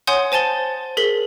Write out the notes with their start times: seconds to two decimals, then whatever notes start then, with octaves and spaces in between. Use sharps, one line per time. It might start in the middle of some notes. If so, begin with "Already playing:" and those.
0.07 C#5 F#5 G#5 C6 D#6 G6
0.32 C5 G#5 A5 A6 G7
0.97 G#4 A#4 B6 F#7